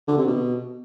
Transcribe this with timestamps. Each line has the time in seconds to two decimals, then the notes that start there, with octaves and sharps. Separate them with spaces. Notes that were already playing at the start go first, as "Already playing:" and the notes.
0.08 D3
0.17 C3
0.27 B2